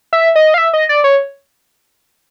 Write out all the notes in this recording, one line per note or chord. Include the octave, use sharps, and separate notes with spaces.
E5
D#5
F5
E5
D#5
D5
C#5